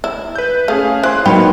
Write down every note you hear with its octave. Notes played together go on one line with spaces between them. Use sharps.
E4 E6
B4 G6
A3 C#4 G#4 F5
E3 C5 C6 F#6
F#3 A#3 D#4 B4 G5 B5